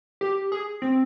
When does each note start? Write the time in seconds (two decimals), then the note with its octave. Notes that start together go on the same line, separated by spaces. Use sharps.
0.21 G4
0.52 G#4
0.82 C4